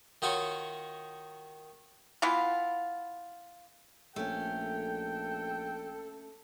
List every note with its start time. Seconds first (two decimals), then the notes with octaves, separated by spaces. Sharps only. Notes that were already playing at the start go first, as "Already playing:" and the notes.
0.22 D#3 D#4 F4 F#4 C#5
2.22 E3 B3 E4 F4
4.16 A#1 A3 C#4 A4 G5